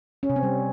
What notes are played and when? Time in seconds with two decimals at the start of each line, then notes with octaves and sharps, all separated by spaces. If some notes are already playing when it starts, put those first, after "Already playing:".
0.23 C#4
0.30 C3
0.36 C4
0.43 G3